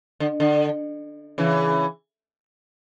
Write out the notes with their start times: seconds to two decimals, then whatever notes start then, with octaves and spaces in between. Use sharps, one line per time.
0.20 D3
0.40 D3
1.38 C#3 E3